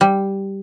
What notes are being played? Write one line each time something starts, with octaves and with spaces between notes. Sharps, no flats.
G3